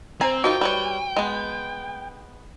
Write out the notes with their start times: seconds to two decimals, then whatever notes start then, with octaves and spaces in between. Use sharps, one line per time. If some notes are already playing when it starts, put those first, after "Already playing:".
0.21 C4 C5 G#5 A#5
0.44 D#3 D#4 F4 F#4 G5
0.61 G3 B4 C#5
1.16 G#3 B3